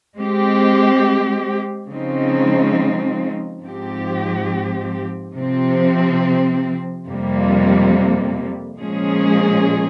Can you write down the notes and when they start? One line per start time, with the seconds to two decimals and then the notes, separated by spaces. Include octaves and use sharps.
0.17 G#3 C4 G4
1.90 C#3 F3 G#3 C4 D#4
3.62 G#2 F3 C4 G4
5.34 C3 F3 C4
7.07 F2 C3 G3 A#3
8.79 A#2 F3 G#3 C#4 G#4